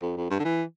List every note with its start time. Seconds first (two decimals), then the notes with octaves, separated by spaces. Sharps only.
0.02 F2
0.17 F2
0.30 G2
0.40 D3
0.45 E3